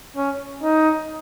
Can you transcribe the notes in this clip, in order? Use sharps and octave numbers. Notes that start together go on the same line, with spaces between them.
C#4
D#4